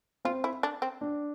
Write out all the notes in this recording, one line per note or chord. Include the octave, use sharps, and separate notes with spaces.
C4 F4
E4
D4
C4
D4